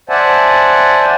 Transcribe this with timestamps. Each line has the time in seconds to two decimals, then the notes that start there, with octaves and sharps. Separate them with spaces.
0.09 C5 D5 E5 F#5 G#5 A5